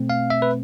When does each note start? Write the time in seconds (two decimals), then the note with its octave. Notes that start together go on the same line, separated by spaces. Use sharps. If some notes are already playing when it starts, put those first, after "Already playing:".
Already playing: B2 A3 C4
0.10 F5
0.30 E5
0.42 B4